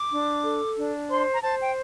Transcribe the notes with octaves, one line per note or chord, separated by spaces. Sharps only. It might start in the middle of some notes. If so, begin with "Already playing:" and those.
Already playing: D6
D4
A4
D4
C5 C6
A#5
C5 A5
G5